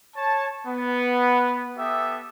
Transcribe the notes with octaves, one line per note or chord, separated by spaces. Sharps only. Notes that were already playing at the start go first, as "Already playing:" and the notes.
C#5 A5
B3
B3 G4 A4 E5 D#6